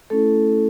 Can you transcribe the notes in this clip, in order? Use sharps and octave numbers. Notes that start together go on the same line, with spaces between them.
A3 C#4 E4 A4